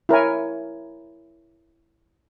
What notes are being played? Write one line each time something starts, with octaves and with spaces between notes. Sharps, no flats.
E4 A#4 C#5 G#5